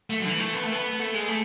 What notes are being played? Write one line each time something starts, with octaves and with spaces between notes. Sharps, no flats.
A3
F#3
D3
E3
A3
B3
A3
B3
A3
G#3
A3